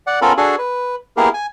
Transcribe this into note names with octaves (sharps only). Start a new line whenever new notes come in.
D5 F#5
B3 C#4 F4 A4 A#4 B5
D4 F#4 G#4 A4 G#5
B4
A#3 B3 E4 G4 G#4 A#4
G#5